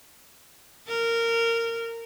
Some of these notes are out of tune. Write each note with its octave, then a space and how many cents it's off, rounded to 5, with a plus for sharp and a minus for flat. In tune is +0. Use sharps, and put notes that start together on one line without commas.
A#4 -15